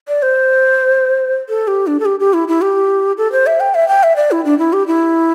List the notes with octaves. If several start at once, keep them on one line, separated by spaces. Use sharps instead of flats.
D5
C5
A4
G4
D4
A4
G4
G4
E4
E4
G4
A4
C5
E5
G5
E5
G5
E5
D5
E4
D4
E4
G4
E4